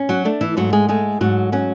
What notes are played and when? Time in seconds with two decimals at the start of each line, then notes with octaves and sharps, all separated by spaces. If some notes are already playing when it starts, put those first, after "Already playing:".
Already playing: C#4
0.09 F#3 F#4
0.25 A3 D4
0.41 E3 E4
0.57 G#2 F#3 F#4
0.73 G#3 G#4
0.89 G#3 A3 G#4
1.21 G#2 F#3 F#4
1.52 F#3 C#4 F#4